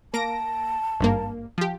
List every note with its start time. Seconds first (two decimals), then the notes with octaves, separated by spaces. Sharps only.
0.14 A#3 A5 A#6 D7
1.00 G#1 G2 A#3
1.58 F3 G4